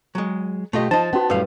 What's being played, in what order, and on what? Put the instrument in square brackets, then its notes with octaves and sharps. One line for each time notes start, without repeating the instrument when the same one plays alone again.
[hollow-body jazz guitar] F#3 G#3
[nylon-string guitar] B2 G4 [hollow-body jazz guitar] A3 F4 D#5
[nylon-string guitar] F3 [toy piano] D#4 [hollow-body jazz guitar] C5 D#5 [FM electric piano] A5
[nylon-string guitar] B3 [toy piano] C#4 F#4
[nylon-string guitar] F#2 G3 [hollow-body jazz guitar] A2 F5 [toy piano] A#4 B4